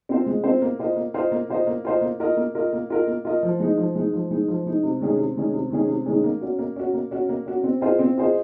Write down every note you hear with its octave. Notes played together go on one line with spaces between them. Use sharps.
C4 F4 C5
G#3
C4 F4 C5
A#3
F4 C5 D#5
A#3
F4 C5 D#5
A#3
F4 C5 D#5
A#3
F4 C5 D#5
A#3
F4 A#4 D#5
A#3
F4 A#4 D#5
A#3
F4 A#4 D#5
A#3
F4 A#4 D#5
F3
G#3 D#4
F3
G#3 D#4
F3
G#3 D#4
F3
G#3 D#4
C3
D#3 G#3 C#4 G#4
C3
D#3 G#3 C#4 G#4
C3
D#3 G#3 C#4 G#4
C3
D#3 G#3 C#4 G#4
A#3
C#4 F#4
A#3
C#4 F#4
A#3
C#4 F#4
A#3
C#4 F#4
C4
F4 G#4 C5 D#5
C4
F4 G#4 C5 D#5